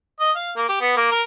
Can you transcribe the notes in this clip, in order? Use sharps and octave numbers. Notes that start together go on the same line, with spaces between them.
D#5
F5
A#3
G4
B3
A#3
A#4